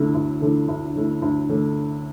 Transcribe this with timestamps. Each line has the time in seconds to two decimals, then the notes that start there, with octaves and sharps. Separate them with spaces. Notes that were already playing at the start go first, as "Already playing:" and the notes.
Already playing: D2 D3 A3 E4
0.15 D2
0.41 D3 A3 E4
0.68 D2
0.96 D3 A3 E4
1.22 D2
1.49 D3 A3